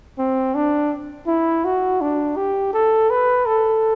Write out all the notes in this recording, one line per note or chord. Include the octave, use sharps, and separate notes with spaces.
C4
D4
E4
F#4
D4
G4
A4
B4
A4